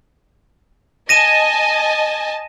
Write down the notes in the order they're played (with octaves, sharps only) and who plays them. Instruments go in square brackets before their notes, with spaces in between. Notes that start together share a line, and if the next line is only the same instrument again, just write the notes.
[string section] D#5 G#5 A5 [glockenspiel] A#6 D#7 E7